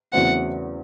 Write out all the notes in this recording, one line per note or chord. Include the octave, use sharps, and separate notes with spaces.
E2 C#3 F#3 A3 C4 F#5